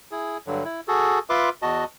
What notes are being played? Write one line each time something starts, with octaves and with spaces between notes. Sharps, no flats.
E4 G#4
G2 D3 F#3
E4
F#4 G#4 A4
F4 B4 E5 C6 D6
E2 F#4 D#5 A5